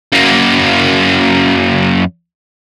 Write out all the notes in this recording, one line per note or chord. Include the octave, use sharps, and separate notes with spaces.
F#2 A#3